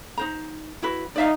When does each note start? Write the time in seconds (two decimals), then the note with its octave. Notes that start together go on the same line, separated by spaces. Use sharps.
0.18 D#4 C5 A#5
0.82 E4 F#4 B4
1.16 D#4 D5 E5 F5